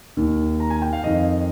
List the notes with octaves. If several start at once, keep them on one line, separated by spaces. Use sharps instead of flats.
D#2 D#3
A#5
G#5
G5
F5
F2 D#3 D#5